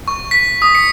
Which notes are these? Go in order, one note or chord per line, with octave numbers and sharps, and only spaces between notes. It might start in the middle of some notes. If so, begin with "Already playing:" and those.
C#6
B6
D#6
C#7